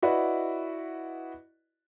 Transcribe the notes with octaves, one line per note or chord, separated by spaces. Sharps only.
E4 F#4 B4 D5 D#5